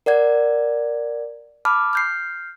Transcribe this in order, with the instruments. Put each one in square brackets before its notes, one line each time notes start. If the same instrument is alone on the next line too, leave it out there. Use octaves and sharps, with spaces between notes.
[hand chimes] A#4 D5 F#5 G#6
A5 B5 D6 F6
F6 G6 C7